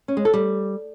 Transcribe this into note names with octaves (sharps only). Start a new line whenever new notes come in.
C#4
G#3
A4
G3